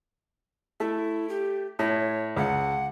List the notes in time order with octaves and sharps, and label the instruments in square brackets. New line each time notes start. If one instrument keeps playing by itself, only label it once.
[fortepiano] A3 [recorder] E4
[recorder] G4
[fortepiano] A2 [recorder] C#5
[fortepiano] C#2 [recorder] F#5